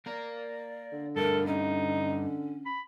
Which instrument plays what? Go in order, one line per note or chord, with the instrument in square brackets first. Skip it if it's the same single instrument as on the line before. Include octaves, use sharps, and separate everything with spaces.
[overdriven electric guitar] A#3 A#4 [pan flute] D5
[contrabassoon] D3
[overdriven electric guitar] G2 A3 [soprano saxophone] A4 [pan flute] A#4
[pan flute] C#4 [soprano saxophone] D#4
[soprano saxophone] B5